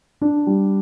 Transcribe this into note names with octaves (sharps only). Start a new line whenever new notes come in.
D4
G3